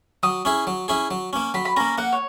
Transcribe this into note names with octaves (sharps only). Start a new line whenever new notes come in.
F#3 D#6
C#4 E4 G#4
F#3
C#4 E4 G#4
F#3
A#3 C#4
F#3 B5
B5
A#3 C#4 A#5
A#3 F#5
C#5